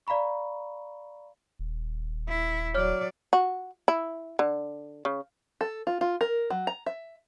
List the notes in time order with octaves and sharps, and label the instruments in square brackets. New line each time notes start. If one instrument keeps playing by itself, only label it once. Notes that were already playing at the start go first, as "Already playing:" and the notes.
[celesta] D5 F5 A#5 B5 C#6
[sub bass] D#1
[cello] E4
[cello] F#3 D5 [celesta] C#5 F6
[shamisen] F#4
E4
D3
C#3
[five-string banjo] A4
F4
F4
A#4
F#3
A#5
E5